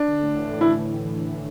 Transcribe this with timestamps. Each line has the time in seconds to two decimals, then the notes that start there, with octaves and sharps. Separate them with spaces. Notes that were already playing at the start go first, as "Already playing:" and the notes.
Already playing: D4
0.08 D3
0.23 A2
0.38 E3
0.53 A2
0.61 E4